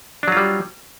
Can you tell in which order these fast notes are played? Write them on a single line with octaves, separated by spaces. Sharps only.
D4 F#3 F4 G3